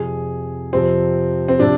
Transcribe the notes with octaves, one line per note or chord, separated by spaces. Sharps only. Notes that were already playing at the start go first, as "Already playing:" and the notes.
Already playing: F2 C3 F3 G#4
F2 C3 F3 C4
C4
C3 F3 D4